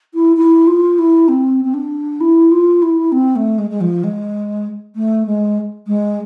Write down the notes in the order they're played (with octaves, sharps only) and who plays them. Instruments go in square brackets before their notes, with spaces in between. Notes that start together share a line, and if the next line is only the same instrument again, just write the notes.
[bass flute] E4
E4
F4
E4
C4
C4
D4
E4
F4
E4
C4
A3
G#3
G#3
F3
G#3
A3
G#3
G#3